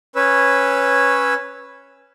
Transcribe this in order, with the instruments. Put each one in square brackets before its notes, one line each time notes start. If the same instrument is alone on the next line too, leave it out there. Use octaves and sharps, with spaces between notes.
[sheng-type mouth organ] C#4 B4 C#5 E6